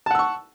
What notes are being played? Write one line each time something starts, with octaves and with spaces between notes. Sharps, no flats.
F#5 A5 C#6 E6